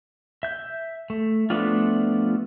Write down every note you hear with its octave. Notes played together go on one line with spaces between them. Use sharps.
E5 G6
A3
F3 A3 B3 D4 F4